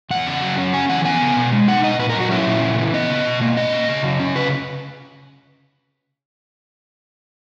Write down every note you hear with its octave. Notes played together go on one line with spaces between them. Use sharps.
E2 F#5
C#3
F#3
C#4
C#3 G#5
E3 F#5
B3 G#5
C#3
B2
G#3
D#4 F#5
B2 D#5
A#2 B4
A#4
F#3
F#4
C#4 E4
A#2
C#3
E3
B3 D#5
C#3
B2
A#3
C#4 D#5
B2
C#3
F#3
C#4
C#3 B4